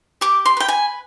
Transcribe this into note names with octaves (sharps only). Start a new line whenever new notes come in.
G4 D6
C6
B4 G5
G#5